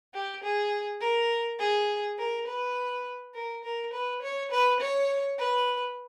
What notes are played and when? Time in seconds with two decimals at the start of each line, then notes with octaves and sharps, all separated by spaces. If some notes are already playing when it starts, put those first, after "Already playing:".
0.14 G4
0.43 G#4
1.01 A#4
1.59 G#4
2.18 A#4
2.47 B4
3.34 A#4
3.64 A#4
3.93 B4
4.22 C#5
4.51 B4
4.80 C#5
5.38 B4